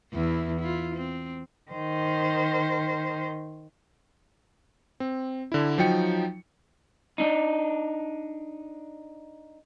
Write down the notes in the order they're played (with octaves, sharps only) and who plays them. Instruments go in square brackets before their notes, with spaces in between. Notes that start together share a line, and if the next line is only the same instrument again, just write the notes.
[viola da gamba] E2 E4
E4 F4
C4
[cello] D#3 C5
[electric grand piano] C4
D3 E4
F3 F#3 D#4 G5 C#7
[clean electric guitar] D4 D#4